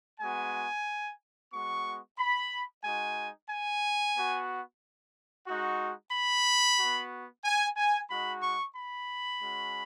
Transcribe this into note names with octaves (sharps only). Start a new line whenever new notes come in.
G#3 B3 F#4 G#5
G#3 B3 F#4 C#6
B5
G#3 D#4 F#4 G#5
G#5
B3 F#4
G#3 D#4 F#4
B5
B3 F#4
G#5
G#5
G#3 D#4 F#4 B5
C#6
B5
G#3 C#4 F#4